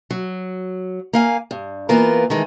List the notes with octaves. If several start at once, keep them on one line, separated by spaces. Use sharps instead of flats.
F#3
A#3 F5 G#5
G2
E3 A#3 B3 F4 A#4
D#3 E3 G#3 A3